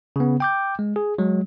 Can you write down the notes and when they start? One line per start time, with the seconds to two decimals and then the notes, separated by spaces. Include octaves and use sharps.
0.16 C#3 B3
0.40 G5 D6 G6
0.79 G#3
0.96 G#4
1.18 F#3 G#3